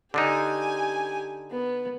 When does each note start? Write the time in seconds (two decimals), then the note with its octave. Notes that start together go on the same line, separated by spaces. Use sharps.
0.14 D3 D4 D#4 G4 G#5
1.51 B3